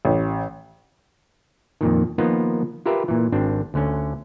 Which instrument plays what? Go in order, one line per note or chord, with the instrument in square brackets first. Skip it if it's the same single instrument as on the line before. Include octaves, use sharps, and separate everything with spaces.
[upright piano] A1
[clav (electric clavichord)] F2 A#2 D#3
D#3 F3 A#3 B3 D#4 F4
F4 G4 A#4 B4 E5
A#2 E3
G#1 C4 D4
D2 D3 C#4